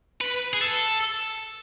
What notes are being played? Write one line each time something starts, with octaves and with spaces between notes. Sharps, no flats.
B4
G#4
A4